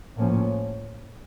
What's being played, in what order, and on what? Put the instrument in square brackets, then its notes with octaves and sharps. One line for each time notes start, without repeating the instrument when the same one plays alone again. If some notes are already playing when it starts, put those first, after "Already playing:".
[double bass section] A2 F3 A#3 C#4